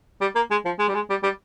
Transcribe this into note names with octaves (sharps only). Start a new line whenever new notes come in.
G3
A#3
G#3
F3
G#3
G3
G#3
G3
G3